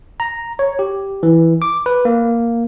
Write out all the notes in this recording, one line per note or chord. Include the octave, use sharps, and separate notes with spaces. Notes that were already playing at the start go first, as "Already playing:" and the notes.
A#5
C#5
G4
E3
D6
B4
A#3